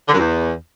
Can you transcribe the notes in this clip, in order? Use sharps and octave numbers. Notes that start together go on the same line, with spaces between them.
D3
F#2
E2